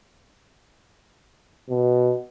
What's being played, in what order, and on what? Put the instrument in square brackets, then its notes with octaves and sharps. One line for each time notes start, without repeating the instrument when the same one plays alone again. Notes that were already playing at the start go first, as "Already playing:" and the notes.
[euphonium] B2